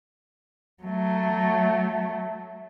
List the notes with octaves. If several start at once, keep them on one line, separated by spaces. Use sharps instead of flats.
F#3 A3